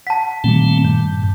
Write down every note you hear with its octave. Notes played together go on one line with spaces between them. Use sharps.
F#5 A5 B6
A#2 D#3 G3 A3 C4
G2